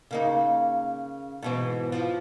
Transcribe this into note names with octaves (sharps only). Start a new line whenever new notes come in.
C#3 A#3 D#4
G#2 B2 E3
F3